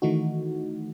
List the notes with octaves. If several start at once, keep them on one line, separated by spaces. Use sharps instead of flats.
D#3 E3 A3 D#4 F#4